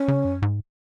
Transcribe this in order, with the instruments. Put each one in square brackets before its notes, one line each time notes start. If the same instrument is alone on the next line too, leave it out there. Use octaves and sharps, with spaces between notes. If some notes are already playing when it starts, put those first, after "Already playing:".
Already playing: [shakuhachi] C#4
[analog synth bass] C#3
F#2
G#2